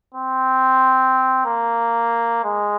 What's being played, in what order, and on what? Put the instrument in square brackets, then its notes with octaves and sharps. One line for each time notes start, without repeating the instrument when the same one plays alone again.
[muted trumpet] C4
A#3
G#3